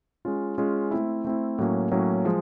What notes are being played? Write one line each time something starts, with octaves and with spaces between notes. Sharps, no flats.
G#3 C#4 F4
G#3 C#4 F4
A3 C4 E4
A3 C4 E4
A2 F#3 A#3 C#4
A2 F#3 A#3 C#4
F3 G#3